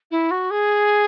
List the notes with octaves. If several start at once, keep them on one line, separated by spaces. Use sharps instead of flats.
E4
F#4
G#4